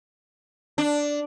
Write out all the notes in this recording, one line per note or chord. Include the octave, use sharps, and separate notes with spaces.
D4